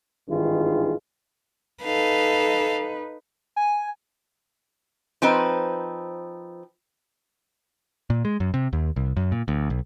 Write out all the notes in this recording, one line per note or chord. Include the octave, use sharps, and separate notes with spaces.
G#1 G2 D#3 E3 F4 G#4
D#4 A4 B4 F5
G#5
F3 C4 D#4 B4
A#2
G#3
F#2
C3
D#2
C2
F#2
A#2
D2
B1